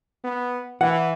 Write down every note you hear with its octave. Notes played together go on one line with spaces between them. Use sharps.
B3
E3 F#5